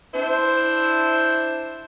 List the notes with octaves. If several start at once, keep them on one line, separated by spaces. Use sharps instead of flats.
D4 E4 C5